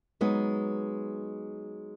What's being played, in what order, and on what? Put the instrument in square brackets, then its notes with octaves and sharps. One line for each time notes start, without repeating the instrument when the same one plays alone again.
[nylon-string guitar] F#3 G#3 B3 D#4